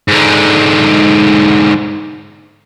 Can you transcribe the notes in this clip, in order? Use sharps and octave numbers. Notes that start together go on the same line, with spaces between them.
G#2 D3